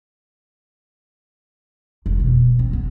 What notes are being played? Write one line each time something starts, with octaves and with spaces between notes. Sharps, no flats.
F1
B2
C4
B3